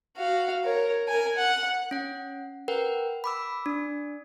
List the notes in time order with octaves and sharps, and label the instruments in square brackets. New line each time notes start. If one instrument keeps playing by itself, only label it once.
[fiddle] F#4 F5
A#4 C#5
A#4 G#5
F#5
[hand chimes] C#4 F#5
A#4 B4 F#5 G5
B5 D6 E6
D4